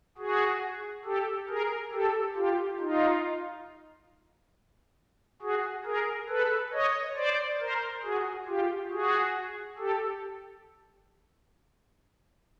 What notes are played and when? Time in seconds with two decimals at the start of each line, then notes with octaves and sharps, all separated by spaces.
0.18 F#4 G#4
1.05 G4 A4
1.49 G#4 A#4
1.93 G4 A4
2.36 F4 G4
2.80 D#4 F4
5.42 F#4 G#4
5.85 G#4 A#4
6.29 A4 B4
6.73 C#5 D#5
7.16 C5 D5
7.60 A#4 C5
8.03 F#4 G#4
8.47 F4 G4
8.91 F#4 G#4
9.78 G4 A4